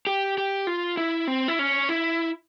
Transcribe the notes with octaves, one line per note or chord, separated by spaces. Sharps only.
G4
G4
F4
E4
C4
E4
C#4
E4